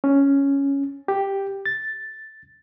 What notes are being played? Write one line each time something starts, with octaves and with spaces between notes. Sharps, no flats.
C#4
G4
A6